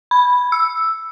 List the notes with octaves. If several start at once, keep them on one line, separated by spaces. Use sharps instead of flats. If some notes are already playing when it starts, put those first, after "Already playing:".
B5
E6